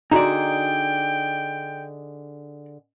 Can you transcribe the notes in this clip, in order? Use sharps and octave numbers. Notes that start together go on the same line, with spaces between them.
D3 D#4 F#4 G#4 D5 G5 A#5